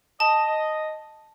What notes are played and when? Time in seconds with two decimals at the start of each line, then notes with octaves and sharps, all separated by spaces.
0.20 D#5 A5